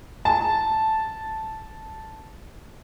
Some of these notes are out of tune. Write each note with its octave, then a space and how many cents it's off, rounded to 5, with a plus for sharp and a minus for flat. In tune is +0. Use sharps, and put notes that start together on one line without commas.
A5 -5